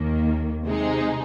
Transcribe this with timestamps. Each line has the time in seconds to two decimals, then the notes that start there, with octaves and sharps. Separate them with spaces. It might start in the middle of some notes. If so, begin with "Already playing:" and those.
Already playing: D#2 D#3 A#3
0.64 C3 G#3 D#4 G#4